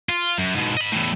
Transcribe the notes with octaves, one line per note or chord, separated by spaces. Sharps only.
F4
F#2
G#2 B2
D#5 B5
E2 A2